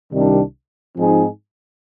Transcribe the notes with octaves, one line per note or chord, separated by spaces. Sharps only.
C2 C3 D#3 G3 D4
G#2 F3 C4 D#4 G#4